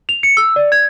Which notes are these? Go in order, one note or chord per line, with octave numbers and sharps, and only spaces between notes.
F7
C#7
E6
D5
G#6